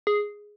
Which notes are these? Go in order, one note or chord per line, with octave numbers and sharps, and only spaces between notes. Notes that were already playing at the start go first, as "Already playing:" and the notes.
G#4